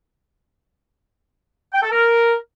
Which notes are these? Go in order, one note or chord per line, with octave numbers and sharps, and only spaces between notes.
G5
A4
A#4